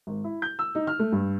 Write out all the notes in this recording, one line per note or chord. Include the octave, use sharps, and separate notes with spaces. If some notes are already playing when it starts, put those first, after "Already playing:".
G#1
E4
G6
E6
D#4
F6
A3
G2